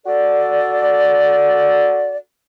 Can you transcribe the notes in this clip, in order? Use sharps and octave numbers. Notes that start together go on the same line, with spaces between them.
F#4 A4 D5